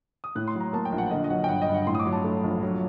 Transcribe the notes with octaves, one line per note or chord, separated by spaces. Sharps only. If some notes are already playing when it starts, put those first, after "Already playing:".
D#6
A2 F#6
C6
F#3
A#5
A#3 A5
G5
A#1
F#5
D3 D#5
D#5
F#3 F#5
G5
G2 F#5
D#5
G2
F#5
A2 C6
D#6
D6
F#3
A5
A3
A#1
F#3